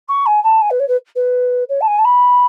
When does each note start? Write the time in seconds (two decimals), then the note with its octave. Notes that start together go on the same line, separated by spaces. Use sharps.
0.08 C#6
0.26 G#5
0.43 A5
0.61 G#5
0.70 B4
0.79 C#5
0.88 B4
1.15 B4
1.69 C#5
1.81 A5
1.87 G#5
1.98 A5
2.04 B5